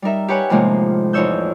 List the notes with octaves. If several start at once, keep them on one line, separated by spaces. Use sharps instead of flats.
G3 D#4 A#4 E5
G4 B4 C#5 F#5 G#5
A2 C3 D#3 F3 G#3 A#3
E2 F3 D#4 C#5 E6 G6